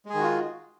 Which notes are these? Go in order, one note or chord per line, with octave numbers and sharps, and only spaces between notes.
D#3 G#3 F4 F#4 G#4